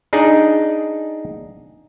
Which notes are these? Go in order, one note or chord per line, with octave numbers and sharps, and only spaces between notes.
D4 D#4 G#4